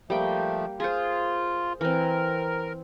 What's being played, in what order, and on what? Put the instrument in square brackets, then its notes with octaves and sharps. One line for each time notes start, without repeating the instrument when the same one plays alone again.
[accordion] F3 A3 [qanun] G3 A#3 G5
[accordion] F4 [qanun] G#4 C5
[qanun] E3 C4 [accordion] A#4